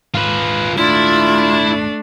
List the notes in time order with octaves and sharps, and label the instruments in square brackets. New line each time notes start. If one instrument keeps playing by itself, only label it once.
[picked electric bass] D#1 G#1 G#2 [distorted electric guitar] F4 B4
[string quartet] A3 D4 [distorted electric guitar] E4 [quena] F4